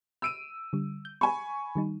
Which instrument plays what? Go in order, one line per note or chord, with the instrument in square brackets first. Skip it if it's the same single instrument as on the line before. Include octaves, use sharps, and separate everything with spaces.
[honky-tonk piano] E6 D7 D#7
[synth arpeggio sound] D3 G3
G6
[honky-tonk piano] G#5 B5 C#6
[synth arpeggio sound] D#3 G3 D#4